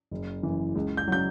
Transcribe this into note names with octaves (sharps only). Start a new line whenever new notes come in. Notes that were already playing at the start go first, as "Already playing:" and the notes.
F#1
F#2 C#3 E3
C#2
G6
C#3 F#3 G6